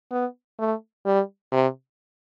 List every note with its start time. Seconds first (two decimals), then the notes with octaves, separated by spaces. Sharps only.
0.11 B3
0.59 A3
1.06 G3
1.52 C3